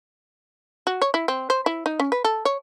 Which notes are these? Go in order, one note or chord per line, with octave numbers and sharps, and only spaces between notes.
F#4
C#5
E4
C4
C5
E4
D#4
C#4
B4
A4
C#5